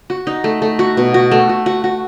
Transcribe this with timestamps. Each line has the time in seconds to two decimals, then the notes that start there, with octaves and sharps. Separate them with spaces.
0.10 F#4
0.27 D#4
0.44 A3
0.62 A3
0.79 F#4
0.97 B2
1.14 F#4
1.31 A3
1.49 F#4
1.66 F#4
1.84 F#4